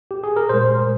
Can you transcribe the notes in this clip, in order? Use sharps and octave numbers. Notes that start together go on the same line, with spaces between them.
G4
G#4
A#4
A#2 G#3 C5